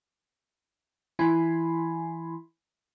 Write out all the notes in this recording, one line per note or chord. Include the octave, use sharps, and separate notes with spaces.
E3 E4 G#5 B5 C6